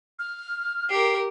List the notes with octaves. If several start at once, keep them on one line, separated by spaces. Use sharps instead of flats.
F6
G4 A#4 C7